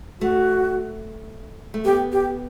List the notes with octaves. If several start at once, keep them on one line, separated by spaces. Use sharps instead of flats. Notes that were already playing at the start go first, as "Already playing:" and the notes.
A3 F#4
A3
B3 G4
G4